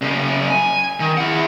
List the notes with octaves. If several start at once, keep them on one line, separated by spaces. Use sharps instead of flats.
F#2 C#3
G#5
D#3
E4 F#5